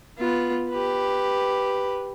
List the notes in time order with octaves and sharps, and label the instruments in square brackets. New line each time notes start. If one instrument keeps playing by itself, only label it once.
[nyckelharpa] B3 F4
G4 B4